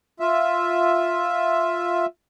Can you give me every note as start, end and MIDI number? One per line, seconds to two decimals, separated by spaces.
0.20 2.06 65
0.20 2.06 76